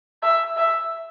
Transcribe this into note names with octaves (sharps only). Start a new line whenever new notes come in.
E5
E5